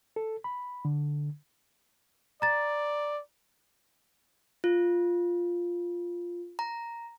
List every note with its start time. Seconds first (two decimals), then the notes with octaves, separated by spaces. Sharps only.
0.16 A4
0.44 B5
0.85 D3
2.42 D5 A#5 A6
4.64 F4
6.59 A#5